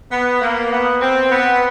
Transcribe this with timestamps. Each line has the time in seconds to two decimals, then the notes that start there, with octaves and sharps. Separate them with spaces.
0.11 B3
0.41 A#3
0.71 B3
1.01 C4
1.31 B3